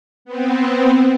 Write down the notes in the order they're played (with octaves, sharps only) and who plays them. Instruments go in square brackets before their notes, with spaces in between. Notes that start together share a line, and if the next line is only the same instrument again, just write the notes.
[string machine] B3 C4